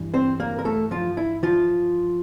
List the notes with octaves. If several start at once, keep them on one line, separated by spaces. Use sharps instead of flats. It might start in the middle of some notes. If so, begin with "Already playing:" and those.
Already playing: G2 E3 G3
C4 C5
A#3 A#4
A#4
A3 A4
F3 F4
E4
F3 F4